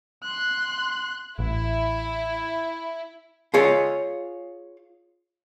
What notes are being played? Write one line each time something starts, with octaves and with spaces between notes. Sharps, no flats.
C6 F#6
A1 E4
F4 G#4 C#5